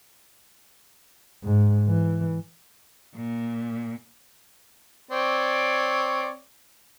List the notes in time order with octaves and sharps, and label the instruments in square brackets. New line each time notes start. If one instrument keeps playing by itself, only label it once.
[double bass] G#2
E3
[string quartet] A#2
[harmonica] C4 C#5 D5